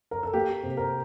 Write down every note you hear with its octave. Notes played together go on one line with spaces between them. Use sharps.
A#4
A4
A#3 G4
C3
A#4